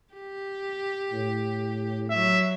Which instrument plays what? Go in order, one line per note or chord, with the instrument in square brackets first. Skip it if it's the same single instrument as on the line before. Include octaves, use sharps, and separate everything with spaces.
[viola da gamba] G4
[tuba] A2
[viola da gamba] F#3 [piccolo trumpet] E5